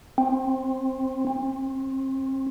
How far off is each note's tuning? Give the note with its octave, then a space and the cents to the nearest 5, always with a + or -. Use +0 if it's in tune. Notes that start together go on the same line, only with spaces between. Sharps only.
C4 +15
C4 +35